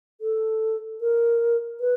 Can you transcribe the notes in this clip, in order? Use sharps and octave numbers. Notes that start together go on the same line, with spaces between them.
A4
A#4
B4